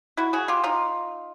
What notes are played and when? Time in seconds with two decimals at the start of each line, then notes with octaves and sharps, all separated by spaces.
0.17 E4 F#4
0.33 F#4 G#4
0.48 F4 G4
0.64 D#4 F4